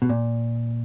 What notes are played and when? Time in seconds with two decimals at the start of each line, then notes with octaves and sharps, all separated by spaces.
0.02 B2
0.09 A#2